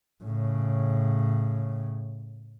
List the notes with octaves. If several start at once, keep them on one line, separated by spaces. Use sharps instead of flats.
A2 C#3